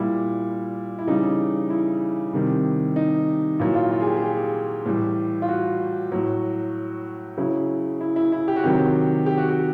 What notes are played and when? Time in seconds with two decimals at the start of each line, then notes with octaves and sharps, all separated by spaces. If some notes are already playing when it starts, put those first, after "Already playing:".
Already playing: A#2 G3 E4
0.99 E4
1.07 C#3 E3 G3 D#4
1.70 E4
2.33 C3 D#3 G3
2.96 D#4
3.59 A#2 F#3 E4
3.75 F4
3.91 F4
4.01 G#4
4.07 G4
4.16 G#4
4.22 G4
4.86 A2 E3 G3
5.42 F4
5.48 F#4
6.12 A2 F#3
7.37 C#3 F#3 E4
8.01 E4
8.16 E4
8.32 E4
8.48 G4
8.56 F#4
8.64 C3 D#3 F#3 G4
9.26 G4
9.38 F#4
9.49 G4